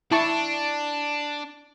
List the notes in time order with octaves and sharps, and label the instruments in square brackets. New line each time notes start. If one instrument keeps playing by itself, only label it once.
[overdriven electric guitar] D4 [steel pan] E4 A5 C#6